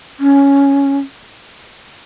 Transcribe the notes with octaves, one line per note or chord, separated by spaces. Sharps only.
C#4